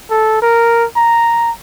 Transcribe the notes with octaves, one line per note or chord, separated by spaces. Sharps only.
A4
A#4
A#5